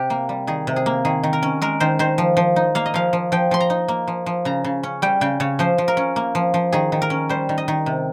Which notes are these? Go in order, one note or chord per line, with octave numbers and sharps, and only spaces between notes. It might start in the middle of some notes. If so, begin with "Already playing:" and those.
Already playing: C3 G4
A#3
G3
D#3 G#4
C3
G#4
A#3
D#3 G#4
D#3
A#4
C#4
G#3 A#4
D#3 C5
D#3 C5
F3
F3
D#4
A#3 F5
D#5
F3 F5
F3
F3 G5
F3 C6
A#5
D#4
A#3
F3
F3
C#3 A#5
C#3
C#4
G3 G5
C#3 G5
C#3 C#5
F3 C5
F3
A#4
C#4
A#3
F3
F3
D#3 G#4
D#3
A#4
C#4
G3 C5
D#3
D#5
D#3
C3